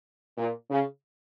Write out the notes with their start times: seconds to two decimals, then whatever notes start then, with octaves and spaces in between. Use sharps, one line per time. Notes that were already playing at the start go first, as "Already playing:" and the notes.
0.38 A#2
0.70 C#3